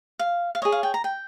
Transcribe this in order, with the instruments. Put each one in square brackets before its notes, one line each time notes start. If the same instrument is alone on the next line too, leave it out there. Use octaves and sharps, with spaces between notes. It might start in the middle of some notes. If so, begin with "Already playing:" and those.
[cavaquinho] F5
F5
C#5 D#5
G#4
F5
G5
A#5
G5